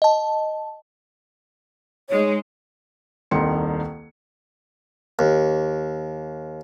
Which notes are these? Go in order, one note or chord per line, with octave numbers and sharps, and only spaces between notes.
D#5 A5
G#3 D#4 C#5
D#1 C2 D#3 C6 C#7
D#2